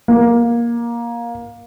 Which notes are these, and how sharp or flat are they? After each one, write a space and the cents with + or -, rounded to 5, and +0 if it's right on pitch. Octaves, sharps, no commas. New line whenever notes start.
A#3 +15